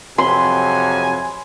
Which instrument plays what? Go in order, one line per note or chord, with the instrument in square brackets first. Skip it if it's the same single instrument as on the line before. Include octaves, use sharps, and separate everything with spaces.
[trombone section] F2 C3 F#3 [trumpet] G#5 [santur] B5 C6